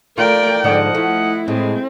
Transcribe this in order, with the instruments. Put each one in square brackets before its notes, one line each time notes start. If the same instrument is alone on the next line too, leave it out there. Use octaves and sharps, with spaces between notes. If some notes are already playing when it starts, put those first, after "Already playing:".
[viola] A3 A#4 [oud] F4 [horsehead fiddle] D5 G5
[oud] G#2 D3 D4 [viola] F3 [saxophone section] D#5 F#5
[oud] A3 [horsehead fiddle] E4
[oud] A2 [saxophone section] G#3 [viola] C4